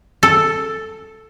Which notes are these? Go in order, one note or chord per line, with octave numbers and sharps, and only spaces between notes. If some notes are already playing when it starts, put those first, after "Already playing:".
A4